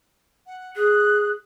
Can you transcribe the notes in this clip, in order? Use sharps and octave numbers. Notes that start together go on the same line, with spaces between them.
F#5
G#4 F#6